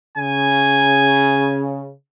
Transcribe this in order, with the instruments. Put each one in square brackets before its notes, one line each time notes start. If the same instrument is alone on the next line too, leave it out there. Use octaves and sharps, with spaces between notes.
[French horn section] C#3 [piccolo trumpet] G#5